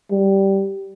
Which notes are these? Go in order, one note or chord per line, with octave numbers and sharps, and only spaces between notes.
G3